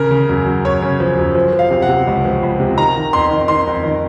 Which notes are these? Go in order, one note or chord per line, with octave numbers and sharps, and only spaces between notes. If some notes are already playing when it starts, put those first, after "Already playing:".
Already playing: C#3 A#4
C#3
F#2
F#2
F#2 C#5
C#3
F3
F#2
F3
F3
F5
C3
F#5
C3
C#2
F3
C#2
C3
D#3 A#5
D#3
F2 C6
D#3
D#3 C6
F2
D#3